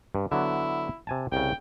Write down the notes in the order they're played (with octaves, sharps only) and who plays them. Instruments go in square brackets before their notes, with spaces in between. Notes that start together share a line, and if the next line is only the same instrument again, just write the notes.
[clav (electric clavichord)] G2
[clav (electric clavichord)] D3 F#3 B3 [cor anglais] E4
[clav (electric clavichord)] C3 G#5 A5
[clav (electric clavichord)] C2 C#3 [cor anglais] G5